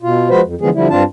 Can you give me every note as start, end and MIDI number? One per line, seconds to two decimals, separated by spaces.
0.02 0.29 47
0.02 0.29 65
0.30 0.41 53
0.30 0.41 56
0.30 0.41 66
0.30 0.41 71
0.30 0.41 72
0.45 0.55 41
0.61 0.69 50
0.61 0.69 52
0.61 0.69 53
0.61 0.69 56
0.61 0.69 59
0.61 0.69 68
0.74 0.88 50
0.74 0.88 53
0.74 0.88 55
0.74 0.88 64
0.90 1.03 43
0.90 1.03 60
0.90 1.03 62
0.90 1.03 65
0.90 1.03 81